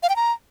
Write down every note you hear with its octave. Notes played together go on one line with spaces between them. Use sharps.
F5
G5
A#5